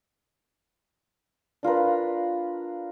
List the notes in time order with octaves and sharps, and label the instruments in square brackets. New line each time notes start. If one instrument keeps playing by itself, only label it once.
[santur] D4 F4 A#4 B4